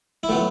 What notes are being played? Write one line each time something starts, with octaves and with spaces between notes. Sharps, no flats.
E4
A2 F#3 B3 F4